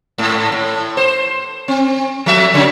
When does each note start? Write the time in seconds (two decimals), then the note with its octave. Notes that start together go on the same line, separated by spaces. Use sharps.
0.18 G#2 A3
0.52 A2
0.97 C5
1.68 C4
2.26 F3 A3 E5
2.54 C#3 F#3 C#4